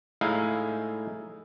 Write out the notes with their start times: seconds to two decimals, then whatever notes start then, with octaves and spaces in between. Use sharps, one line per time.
0.21 A2 G#3 D#4 E4 F5